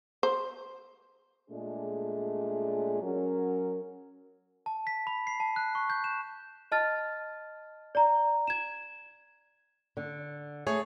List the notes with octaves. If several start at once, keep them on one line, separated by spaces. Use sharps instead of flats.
C5
A#2 G#3 A3 D4 G#4
F#3 C#4 A#4
A5
B6
B5
C7
A5
F#6
C#6
G6
E7
D#5 A5 F6 A6
D5 A#5
G#6 E7
D3
A3 G#4 C#5